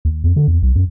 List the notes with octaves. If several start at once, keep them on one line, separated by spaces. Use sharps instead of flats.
D#2
F2
D3
E2
B1
F#2